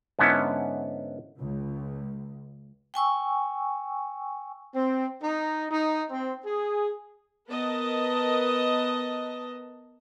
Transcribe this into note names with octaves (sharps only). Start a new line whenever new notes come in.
G#2 D3 B3 C#4 E4
C#2
G5 G#5 C#6 E6
C4
D#4
D#4
C4
G#4
B3 A#4 B4 D#5 A5